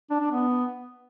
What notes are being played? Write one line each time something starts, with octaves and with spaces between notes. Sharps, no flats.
D4
D4
B3